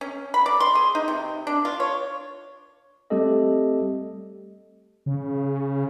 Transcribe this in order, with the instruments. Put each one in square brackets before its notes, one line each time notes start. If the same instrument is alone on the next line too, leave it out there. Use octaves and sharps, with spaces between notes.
[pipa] C#4
B5
D5
C6
G#4
D#4
C3
D4
F4
C#5
[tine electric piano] G3 A3 C4 G4 A4 D#5
[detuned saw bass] C#3